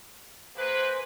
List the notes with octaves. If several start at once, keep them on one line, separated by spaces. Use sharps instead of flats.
A#3 G#4 B4 C5